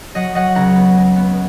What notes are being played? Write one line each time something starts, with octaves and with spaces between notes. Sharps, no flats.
F#3 D#5 F#5
F#3 D#5 F#5
C#2 F#5 A#5
B3
G#3
B3